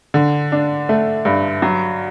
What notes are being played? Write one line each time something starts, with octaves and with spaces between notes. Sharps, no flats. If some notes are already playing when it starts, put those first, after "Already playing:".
D3
D4
A3
G2
F#3